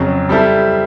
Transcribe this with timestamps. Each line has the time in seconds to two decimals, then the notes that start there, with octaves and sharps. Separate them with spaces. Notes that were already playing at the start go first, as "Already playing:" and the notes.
Already playing: F2 C#3 F#3
0.29 G3 C4 E4 A4 C5